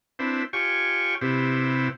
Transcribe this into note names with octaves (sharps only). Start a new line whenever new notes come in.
C4 D4 E4 B4 C5
F4 G4 C#5 G5 G#5 C#6
C3 B3 E4 G4 C5